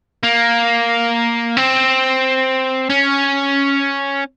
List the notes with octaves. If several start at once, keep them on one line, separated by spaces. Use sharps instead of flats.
A#3
C4
C#4